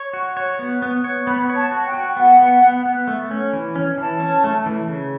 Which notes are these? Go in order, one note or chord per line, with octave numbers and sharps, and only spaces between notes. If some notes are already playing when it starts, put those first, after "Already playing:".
Already playing: C#5
F#4
C#5
B3
B3
C#5
B3 B5
C#5
A5
F#4
G5
F#4
B3 F#5
B3
B3
B3
A3
C#4
E3
C#4
E3 A5
C#4
A3
E3
C#3